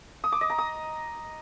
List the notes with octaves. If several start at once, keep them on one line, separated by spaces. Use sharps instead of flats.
D#6
D6
D#5
A#5
D#6